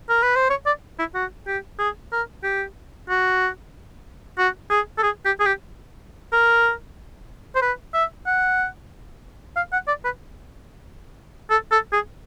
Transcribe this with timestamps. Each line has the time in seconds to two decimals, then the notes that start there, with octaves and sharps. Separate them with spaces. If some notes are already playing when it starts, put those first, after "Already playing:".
0.09 A#4
0.22 B4
0.36 C5
0.50 C#5
0.66 D5
0.99 E4
1.15 F#4
1.47 G4
1.79 G#4
2.12 A#4
2.43 G4
3.09 F#4
4.38 F#4
4.70 G#4
4.98 A4
5.03 G#4
5.25 G4
5.40 G#4
5.46 G4
6.32 A#4
7.55 C5
7.62 B4
7.94 E5
8.26 F#5
9.56 F5
9.72 F#5
9.88 D5
10.05 B4
11.50 A4
11.72 A4
11.93 G#4